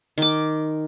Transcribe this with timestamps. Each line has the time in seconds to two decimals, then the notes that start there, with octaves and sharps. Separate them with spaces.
0.18 D#3 D6